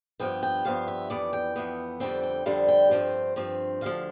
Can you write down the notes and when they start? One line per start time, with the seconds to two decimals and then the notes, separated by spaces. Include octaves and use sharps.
0.20 G2 F3 B3 G5
0.43 G5
0.65 G2 F3 B3 F5
0.88 E5
1.10 F2 E3 B3 D5
1.33 G5
1.56 F2 E3 B3
2.00 F2 D3 G3 C4 G5
2.23 G5
2.46 F2 D3 G3 C4 F5
2.68 G5
2.91 G2 F3 C4
3.36 G2 F3 C4
3.81 D2 D3 F3 F5